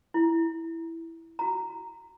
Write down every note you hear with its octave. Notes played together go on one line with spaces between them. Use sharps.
E4
F#4 A#5